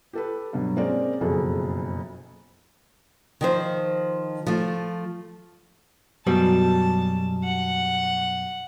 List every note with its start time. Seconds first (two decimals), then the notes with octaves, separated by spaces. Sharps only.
0.13 G4 A4 B4
0.53 G2 B2 F#3
0.76 G#3 A#3 C4 C#4 A#4 D5
1.21 F#1 F2 B2 F#4 G#4 A4
3.41 D#3 F3 C5
4.47 F3 A3
6.27 F#2 B2 G3 A5
7.44 F#5